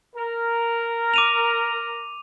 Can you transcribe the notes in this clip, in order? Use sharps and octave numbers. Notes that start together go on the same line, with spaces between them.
A#4
D6 D#7 F7